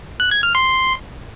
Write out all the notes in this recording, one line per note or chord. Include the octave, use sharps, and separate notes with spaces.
F#6
G#6
F6
C6